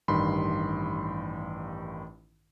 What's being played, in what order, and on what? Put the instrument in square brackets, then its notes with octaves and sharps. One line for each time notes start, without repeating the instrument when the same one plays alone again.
[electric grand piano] A1 G2 D#3 B5 C6